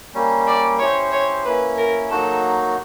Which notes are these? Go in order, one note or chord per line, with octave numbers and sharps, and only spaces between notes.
G3 A#3 C#4
D5
C#4 E4 G4 C5 C#5
C#5
A#3 C#4 E4 B4
A#4
F#3 A#3 D#4 F#4 A4